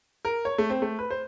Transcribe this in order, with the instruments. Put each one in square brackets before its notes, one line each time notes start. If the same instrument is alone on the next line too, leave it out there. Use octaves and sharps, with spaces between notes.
[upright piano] A#4
C#5
A3
C4
A3
B4
C5